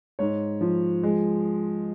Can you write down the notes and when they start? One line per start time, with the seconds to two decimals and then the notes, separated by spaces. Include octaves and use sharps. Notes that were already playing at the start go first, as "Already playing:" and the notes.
0.19 G#2 C#5
0.61 F3
1.03 G#3